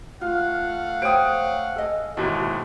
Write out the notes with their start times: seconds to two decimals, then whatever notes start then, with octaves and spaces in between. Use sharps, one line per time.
0.21 A3 F4 F5 F#5
1.02 C5 C#5 G5 D#6 D7
1.76 A4 D#5 G#5
2.17 D#2 G#2 B2 E4